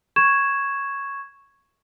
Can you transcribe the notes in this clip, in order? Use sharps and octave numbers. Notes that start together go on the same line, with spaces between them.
C#6 G#6 E7